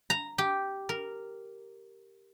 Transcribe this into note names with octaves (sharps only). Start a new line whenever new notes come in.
A#5
G4
A#4